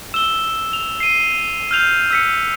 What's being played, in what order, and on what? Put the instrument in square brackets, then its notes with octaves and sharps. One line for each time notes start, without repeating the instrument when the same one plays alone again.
[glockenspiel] E6 [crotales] E7 G7
[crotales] F7
C7 D#7
F6 G6 F7
[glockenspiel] E6 B6 C#7